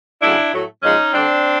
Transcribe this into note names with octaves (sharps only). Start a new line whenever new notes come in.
C#3 F#3 A3 D4 E4
A2 F#3 A3
A#2 F3 G#3 C#4 D#4
D3 G3 C4 D4